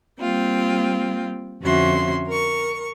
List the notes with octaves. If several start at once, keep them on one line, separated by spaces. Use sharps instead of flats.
G3 A#3 C4 F4 G5
F2 D3 C#4 F#4 E5 C6
A#4 C#6